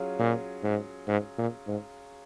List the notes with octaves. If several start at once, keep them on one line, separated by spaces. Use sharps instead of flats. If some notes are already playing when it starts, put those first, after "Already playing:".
Already playing: F#3 C#4 F4 G#4
A#2
G#2
G#2
A#2
G#2